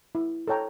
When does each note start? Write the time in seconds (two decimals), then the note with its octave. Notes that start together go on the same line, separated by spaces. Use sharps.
0.15 E4
0.47 A4 C#5 G5 A#5